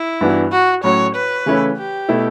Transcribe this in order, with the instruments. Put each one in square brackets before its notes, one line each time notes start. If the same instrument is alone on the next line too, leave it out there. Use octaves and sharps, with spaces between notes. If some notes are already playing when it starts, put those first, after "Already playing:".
Already playing: [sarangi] E4
[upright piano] G2 E3 B3 D4 F#4
[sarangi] F#4
[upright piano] A2 F#3 C#4 F#4 [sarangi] C#5
[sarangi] B4
[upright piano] C#3 E3 A3 C#4 E4
[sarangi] G4
[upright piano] B2 A3 E4